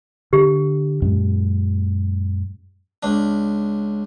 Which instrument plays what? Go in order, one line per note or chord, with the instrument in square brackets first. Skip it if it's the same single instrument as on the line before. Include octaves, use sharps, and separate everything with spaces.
[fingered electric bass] D3 [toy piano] G4
[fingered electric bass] F#2 A#2 G#3
[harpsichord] C#2 D4